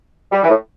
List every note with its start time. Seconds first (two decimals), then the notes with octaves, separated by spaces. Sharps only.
0.32 G3
0.43 E3
0.49 A2